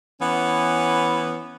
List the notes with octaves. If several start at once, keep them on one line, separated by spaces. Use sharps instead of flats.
E3 B3 C#4